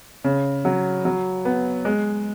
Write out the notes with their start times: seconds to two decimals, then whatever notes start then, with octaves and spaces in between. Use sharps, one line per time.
0.24 C#3
0.65 F#3
1.05 F#3
1.45 B3
1.85 G#3